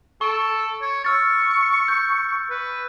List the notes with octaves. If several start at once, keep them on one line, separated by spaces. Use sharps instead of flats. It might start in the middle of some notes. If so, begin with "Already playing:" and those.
A4 C#6 D7
C#5
C#6 E6 F6 A6
G6
B4